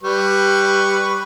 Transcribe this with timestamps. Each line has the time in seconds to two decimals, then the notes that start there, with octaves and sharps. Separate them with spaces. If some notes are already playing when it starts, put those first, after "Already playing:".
0.03 G3 B4 C#6